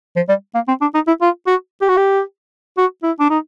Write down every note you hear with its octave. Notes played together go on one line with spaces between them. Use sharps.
F3
G3
A#3
C4
D4
D#4
E4
F4
F#4
G4
F#4
G4
F#4
E4
D4
D#4